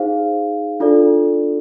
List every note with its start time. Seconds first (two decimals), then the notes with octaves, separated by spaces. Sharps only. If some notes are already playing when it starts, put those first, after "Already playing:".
Already playing: D#4 G#4 C5 F5
0.80 D4 F4 A4 D5